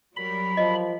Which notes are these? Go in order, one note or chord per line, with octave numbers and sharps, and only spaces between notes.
F#3 G3 A#4 B5
F3 D#5